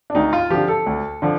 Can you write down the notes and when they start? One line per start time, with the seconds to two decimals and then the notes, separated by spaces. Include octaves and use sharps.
0.10 D4
0.15 D2 D#4
0.33 F4
0.50 D3 F3 G4
0.68 A4
0.86 D2
1.22 D3 F3